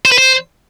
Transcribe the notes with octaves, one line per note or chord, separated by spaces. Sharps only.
C5
B4
C5